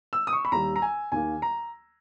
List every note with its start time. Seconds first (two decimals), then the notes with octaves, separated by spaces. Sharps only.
0.13 E6
0.27 D#6
0.33 C#6
0.45 B5
0.52 D#2 D#3 G3 A#5
0.76 A#5
0.82 G#5
1.12 D#2 D#3 A#3 G#5
1.42 A#5